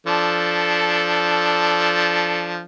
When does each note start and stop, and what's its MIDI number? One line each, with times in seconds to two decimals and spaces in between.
0.06 2.65 53
0.06 2.65 62
0.06 2.65 69